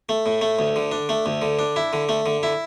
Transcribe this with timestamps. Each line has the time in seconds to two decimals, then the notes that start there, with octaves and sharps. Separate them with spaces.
0.09 A3
0.26 A2
0.41 A3
0.59 D2
0.76 D3
0.92 D4
1.09 A3
1.26 D2
1.42 D3
1.59 D4
1.76 E4
1.93 D3
2.09 A3
2.26 D3
2.43 E4